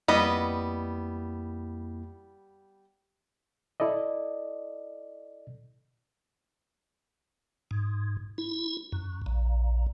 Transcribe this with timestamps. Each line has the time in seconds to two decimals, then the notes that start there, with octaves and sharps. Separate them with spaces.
0.08 F2 G3 A#3 B3 E4 D#5
3.80 E4 A4 D5 D#5
7.71 G#2
8.38 E4
8.92 F#2
9.26 A#1